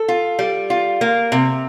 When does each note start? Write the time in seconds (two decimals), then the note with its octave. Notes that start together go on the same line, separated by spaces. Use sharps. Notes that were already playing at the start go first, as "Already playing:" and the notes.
Already playing: A4
0.08 F4
0.39 G3
0.70 F4
1.01 A#3
1.32 C3